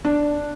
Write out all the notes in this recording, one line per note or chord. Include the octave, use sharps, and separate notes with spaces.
D4